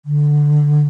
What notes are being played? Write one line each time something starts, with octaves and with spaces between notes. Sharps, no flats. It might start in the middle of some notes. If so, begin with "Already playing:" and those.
D3